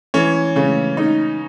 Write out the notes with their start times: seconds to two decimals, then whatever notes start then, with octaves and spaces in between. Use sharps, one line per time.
0.14 E3 C#4 C#5
0.56 C#3
0.97 D#4